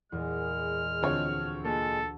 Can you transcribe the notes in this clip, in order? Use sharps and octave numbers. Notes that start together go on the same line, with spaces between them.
E2 A#2 G#3 F6
D2 F3 C4 C#5
A#2 G#3 A4 A5